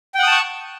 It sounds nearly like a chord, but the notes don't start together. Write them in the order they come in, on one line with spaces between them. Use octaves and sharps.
G5 F#5 D#6 A5 C#6